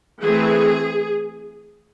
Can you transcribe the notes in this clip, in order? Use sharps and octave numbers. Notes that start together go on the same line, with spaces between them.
E3 A3 C4 G#4